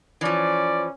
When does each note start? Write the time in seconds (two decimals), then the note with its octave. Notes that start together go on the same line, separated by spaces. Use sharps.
0.21 E3 F3 C#4 D5